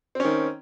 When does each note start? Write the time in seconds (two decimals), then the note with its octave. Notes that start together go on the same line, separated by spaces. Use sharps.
0.15 C4
0.20 C#4
0.24 D#3